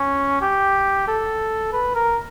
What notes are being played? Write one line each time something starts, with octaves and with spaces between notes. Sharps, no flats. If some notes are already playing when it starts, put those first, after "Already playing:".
Already playing: C#4
G4
A4
B4
A#4